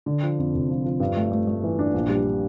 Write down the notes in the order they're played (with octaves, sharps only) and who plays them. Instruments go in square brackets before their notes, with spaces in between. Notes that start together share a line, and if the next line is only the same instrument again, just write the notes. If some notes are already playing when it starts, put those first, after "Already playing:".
[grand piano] D3
F3
F2
F1
F3
F3
G2
A3
A3
A3
E3
D4
A#1
G3